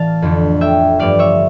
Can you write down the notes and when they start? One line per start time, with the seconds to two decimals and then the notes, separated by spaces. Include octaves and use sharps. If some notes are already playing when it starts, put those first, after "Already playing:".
Already playing: A2 E3 D5 F5 A5
0.22 F2 D3 A3
0.61 E5 G5
0.99 G2 F3 A3 D5 F5
1.19 C#5 E5